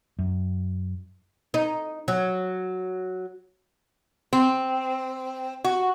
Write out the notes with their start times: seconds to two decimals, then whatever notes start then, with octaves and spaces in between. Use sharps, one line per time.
0.19 F#2
1.54 D#4
2.08 F#3
4.33 C4
5.64 F#4